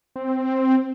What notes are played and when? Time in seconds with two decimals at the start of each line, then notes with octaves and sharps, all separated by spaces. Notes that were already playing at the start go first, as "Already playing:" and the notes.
0.16 C4